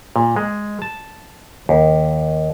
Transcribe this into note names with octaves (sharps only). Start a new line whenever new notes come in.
A#2
G#3
A5
D#2